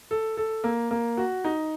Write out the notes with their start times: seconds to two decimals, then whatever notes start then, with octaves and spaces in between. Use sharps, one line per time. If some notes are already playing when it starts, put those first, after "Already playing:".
0.11 A4
0.37 A4
0.64 A#3
0.91 A#3
1.17 F#4
1.44 D#4